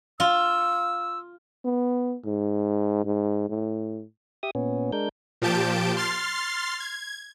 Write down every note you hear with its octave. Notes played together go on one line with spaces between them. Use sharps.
F4 E6
B3
G#2
G#2
A2
G4 E5 D#6
A#2 B3 C#4
G#3 D4 A#4 G6
A#2 F3 G4 A5 G6 D7
C6 F6 A6 C7
G#6